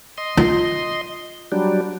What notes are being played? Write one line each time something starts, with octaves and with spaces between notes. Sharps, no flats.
D#5 C6
F4
F#3 G3 D4